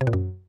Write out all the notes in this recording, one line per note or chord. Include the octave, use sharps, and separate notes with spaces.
C3
A#2
F#2